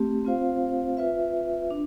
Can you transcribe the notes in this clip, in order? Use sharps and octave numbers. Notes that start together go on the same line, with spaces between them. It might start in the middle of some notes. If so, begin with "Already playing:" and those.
Already playing: A3 C4 G4
C4 F4 C5 F5
F4 B4 E5
D4